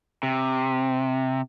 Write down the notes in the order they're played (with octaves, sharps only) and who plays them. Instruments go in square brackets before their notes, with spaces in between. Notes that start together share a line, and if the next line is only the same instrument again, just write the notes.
[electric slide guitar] C3